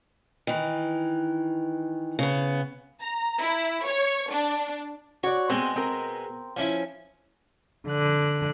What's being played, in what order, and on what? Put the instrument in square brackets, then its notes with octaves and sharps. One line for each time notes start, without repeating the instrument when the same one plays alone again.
[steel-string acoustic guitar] D#3 E3
C#3 B3
[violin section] A#5
E4
C#5
D4
[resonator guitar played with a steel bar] F#4 D5 [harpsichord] C#5
[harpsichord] B2 G#3 [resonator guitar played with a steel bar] C4
[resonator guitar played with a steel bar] C4 A#4
[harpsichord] F3 C#4 E4
[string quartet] D3 F#6